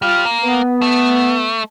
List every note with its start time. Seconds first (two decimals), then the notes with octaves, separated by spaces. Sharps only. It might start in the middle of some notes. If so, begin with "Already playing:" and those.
0.02 G3 F4 F6
0.25 A#3
0.42 B3
0.82 A3